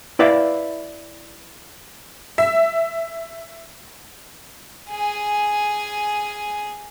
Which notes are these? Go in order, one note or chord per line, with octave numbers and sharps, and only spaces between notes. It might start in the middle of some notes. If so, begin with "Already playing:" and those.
E4 B4 D5 E5 F5
E5
G#4 G#5